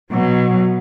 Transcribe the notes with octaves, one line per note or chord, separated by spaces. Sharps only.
B2 F#3